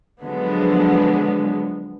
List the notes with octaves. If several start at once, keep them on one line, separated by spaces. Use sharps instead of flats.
D3 F3 F#3 G#3 B3